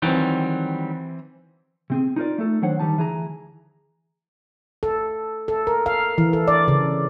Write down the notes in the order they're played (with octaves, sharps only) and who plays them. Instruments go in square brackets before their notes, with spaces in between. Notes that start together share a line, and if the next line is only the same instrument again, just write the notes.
[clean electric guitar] D#3 F#3 G3 [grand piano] E3 C4
[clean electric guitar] C3 C4 G#4
D#4 F4 G4 A#4 D5
A3 D#4 A4
D#3 F#3 D4 C5 C#5 F#5
D#3 G3 D#4 A5
D2 E3 G#4 A#5
[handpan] A4
A4
A#4
F5
E3
A4
D5
C#3